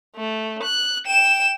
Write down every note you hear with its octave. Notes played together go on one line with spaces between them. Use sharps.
A3
F#6
G5 E7